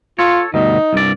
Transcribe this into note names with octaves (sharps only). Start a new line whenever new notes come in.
F4 A4 C#5
D2 G2 B2 D#4
C2 G2 D5